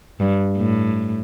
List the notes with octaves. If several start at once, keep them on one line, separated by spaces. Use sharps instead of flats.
G2
A2